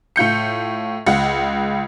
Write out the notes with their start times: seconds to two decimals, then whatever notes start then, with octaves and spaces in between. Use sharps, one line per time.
0.16 A2 F4 G6 C#7
1.07 C#2 F4 F#5